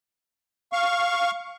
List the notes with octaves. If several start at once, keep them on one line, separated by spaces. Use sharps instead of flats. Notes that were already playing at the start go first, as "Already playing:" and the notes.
F5 C#6